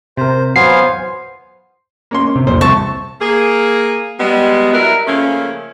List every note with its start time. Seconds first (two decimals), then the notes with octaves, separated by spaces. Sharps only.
0.17 C3 A#4 C5
0.56 F#3 B3 C5 F5 G#5 C7
2.11 A#3 C#4 C6
2.36 C3
2.47 C2 F2 A#2 C5
2.61 C2 C3 A5 C#6
3.21 A#3 G#4
4.20 G3 G#3 B3
4.73 F#3 G3 E4 A#4 B4 E5
5.07 C#3 F3 A3 A#3 C#4